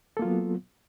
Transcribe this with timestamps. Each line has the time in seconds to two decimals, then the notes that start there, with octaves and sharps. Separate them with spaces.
0.17 A4
0.19 A#3
0.22 F4
0.25 F#3
0.27 B3